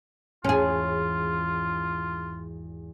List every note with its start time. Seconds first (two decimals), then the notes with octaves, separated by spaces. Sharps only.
0.44 G#1 E2 C#4 F4 G#4